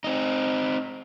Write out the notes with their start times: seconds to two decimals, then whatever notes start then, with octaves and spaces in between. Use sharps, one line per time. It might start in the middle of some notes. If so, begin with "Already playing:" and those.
0.04 C4 D#4